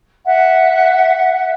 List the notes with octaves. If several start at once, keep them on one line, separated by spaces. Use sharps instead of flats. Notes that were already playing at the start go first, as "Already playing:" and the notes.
E5 F#5